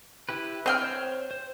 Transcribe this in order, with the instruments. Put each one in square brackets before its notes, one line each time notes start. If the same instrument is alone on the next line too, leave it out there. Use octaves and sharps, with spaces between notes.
[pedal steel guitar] E4 G4 B4
[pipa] C4 G5 [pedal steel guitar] G#4 F6
[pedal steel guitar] C5 C#5
C5